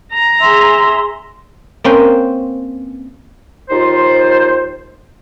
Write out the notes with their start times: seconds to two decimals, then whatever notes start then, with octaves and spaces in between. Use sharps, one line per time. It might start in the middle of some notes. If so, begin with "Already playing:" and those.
0.12 A#5
0.41 G#4 E5 C6
1.84 A#3 C4 C#4 B4 C5
3.70 D#2 D#4 F4 C5